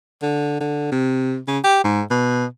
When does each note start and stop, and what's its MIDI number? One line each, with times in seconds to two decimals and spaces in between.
0.22 0.59 50
0.60 0.91 50
0.92 1.39 48
1.48 1.58 49
1.64 1.83 67
1.84 2.02 44
2.10 2.45 47